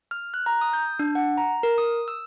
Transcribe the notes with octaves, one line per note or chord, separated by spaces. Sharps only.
F6
F#6
A#5
D#6
G6
D4
F#5
A#5
A#4
D#6
E6